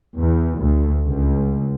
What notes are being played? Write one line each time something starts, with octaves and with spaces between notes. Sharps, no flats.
E2
D2
C#2